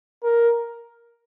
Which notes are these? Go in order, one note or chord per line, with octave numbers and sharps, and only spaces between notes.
A#4